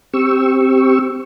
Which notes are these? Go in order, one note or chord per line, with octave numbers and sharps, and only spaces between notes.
C4 G4 C#6 E6